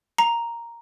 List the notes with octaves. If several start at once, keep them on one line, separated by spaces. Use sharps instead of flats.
A#5